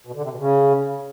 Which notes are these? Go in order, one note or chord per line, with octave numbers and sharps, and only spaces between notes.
B2
D3
C3
B2
C#3